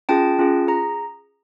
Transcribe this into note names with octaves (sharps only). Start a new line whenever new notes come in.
C#4 F4 G#4 G5 A5
C#4 F4 G#4
G#4 A#5